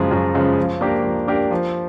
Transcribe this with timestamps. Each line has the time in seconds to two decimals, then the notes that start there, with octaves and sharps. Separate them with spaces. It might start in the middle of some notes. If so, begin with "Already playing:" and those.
Already playing: F#2 C#3 F3 G#3
0.11 F#2
0.34 C#3 F3 G#3
0.58 F3
0.81 A#3 D4 G4 A#4
1.04 F3
1.28 A#3 D4 G4 A#4
1.51 F3